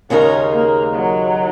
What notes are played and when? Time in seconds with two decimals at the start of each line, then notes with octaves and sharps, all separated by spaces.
0.10 D#2 C#3 G#3 C#4 D#4 A#4
0.53 A#3
0.95 F#3